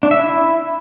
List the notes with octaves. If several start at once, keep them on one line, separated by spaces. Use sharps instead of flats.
D4
E5
E4